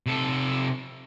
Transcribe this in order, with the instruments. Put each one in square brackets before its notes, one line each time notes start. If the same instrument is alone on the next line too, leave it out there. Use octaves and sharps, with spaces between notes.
[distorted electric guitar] C3 A4